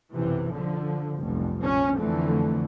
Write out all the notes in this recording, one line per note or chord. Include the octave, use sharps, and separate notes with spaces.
B1 F#2 C3 E3
D3 F3
F1 B1 G2
A#1 C#4
F2 D3 E3 A3